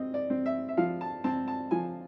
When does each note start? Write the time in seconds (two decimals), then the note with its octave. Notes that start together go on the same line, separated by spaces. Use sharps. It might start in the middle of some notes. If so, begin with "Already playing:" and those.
Already playing: C4 D#5
0.14 D5
0.30 C4
0.46 E5
0.68 E5
0.77 F3 F5
1.01 A5
1.24 C4 A5
1.48 A5
1.71 F3 G#5